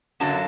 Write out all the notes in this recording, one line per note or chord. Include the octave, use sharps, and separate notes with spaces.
F#2 D3 F#3 A#3 A5